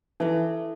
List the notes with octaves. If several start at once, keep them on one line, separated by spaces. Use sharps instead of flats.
E3 E4 A4 E5 A5